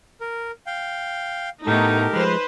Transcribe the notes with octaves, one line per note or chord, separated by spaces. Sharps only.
A#4
F5 G5
A2 A3 B3 D#4 G4 A#4
F3 G#3 B4 C5